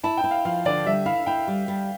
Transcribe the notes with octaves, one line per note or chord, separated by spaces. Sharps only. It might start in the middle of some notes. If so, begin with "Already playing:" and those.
E4 A5
G5
E4
F5
F3 F5
D3 D5
G3 E5
E4 F5
E4 G5
G3
G3